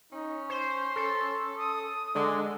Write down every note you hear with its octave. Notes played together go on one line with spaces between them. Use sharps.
C#4 D#4
C5 C6
A4
D#6
D3 G#3 D4